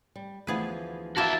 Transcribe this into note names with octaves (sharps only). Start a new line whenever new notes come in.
G3
D2 E3 F3 B3 G#4 B4
A#3 E4 F#4 E5 A5